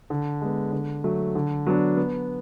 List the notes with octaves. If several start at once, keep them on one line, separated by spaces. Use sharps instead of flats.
D3
G#3 B3
D3
F#3 A3
D3
F#3 B3 D4
B3